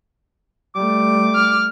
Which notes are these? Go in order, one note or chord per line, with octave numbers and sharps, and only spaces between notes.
G3 A3 D6
F6